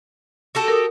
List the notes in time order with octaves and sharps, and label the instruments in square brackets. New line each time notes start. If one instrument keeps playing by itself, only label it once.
[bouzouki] F#4 G4 A4
[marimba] A#4 D#6